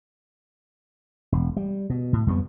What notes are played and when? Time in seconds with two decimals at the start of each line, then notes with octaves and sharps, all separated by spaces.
1.32 E1
1.57 G3
1.90 B2
2.13 A2
2.27 F2 G3 B3